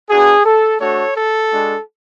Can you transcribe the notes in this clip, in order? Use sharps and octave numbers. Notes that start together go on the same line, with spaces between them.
B3 D4 F#4 G#4
A4
A3 D4 F#4 A4 C#5
A4
G#3 D4 F#4